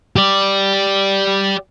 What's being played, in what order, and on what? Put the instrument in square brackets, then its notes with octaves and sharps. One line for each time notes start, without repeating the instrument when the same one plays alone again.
[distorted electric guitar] G4 D5